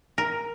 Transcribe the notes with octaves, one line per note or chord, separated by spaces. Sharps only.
A#4